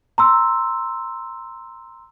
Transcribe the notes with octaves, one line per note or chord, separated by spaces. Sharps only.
A#5 C6 E6